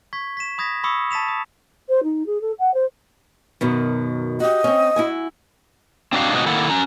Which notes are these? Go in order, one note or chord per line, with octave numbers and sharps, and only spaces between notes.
C#6 G#6 B6
B6 E7
B5 D#6 G#6 A#6 B6
B5 C#6 D#6 E6 C#7
A5 A6 B6 E7 F7
D#6
C5
D#4
G#4
A4
F#5
C5
F#2 B2 D#3
F#4 G4 D#5
C4 C#4
E4 F#4 G#5
C4 D4 D#4 F#4 D#5 F5
A2 C3 G#3 D#4 F#4
D#3 A#3 E4 A4 F#5
C#4 A#5